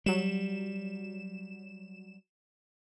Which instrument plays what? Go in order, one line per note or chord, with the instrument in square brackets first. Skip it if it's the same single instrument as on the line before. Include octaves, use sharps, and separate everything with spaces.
[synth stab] F#3 E7 [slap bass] G3